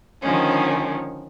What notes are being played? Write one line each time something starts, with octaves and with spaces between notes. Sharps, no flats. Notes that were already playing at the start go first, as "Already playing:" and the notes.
D3 D#3 F3 G#3 C#4